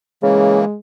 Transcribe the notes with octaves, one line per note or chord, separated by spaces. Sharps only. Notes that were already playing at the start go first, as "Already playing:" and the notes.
C#3 E3 G#3 A#3